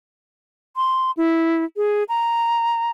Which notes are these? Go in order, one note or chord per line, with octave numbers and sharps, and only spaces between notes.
C6
E4
G#4
A#5